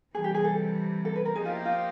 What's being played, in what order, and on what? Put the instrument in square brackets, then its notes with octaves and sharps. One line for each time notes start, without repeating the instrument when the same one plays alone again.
[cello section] C3 E3 G3 [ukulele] G#4
[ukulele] G4
G#4
A4
A4
B4
A#4
[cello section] F3 A#3 D#4 G4 C5 [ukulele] G#4
[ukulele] F4
E4
F4